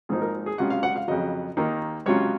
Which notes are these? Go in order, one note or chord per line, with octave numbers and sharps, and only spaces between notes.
G#1 G#2 F3 A#3 D#4 G#4
A#4
G#4
C#2 C3 F#3 C#4 F4 F#5
F5
F#5
F5
F2 C#3 F#3 D#5
D#2 D#3 A#3 D#4
C#2 C3 F#3 C#4 F4 C#5